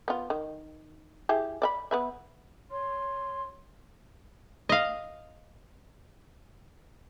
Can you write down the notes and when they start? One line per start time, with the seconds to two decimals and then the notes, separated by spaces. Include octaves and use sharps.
0.08 B3 F4
0.30 D#3
1.29 E4 G4 G#4
1.62 D5 E5 B5
1.91 B3 B4 E5
2.71 C#5 C6
4.69 D#5 F5